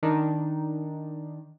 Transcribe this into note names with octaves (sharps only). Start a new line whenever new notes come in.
D#3 D4 D#4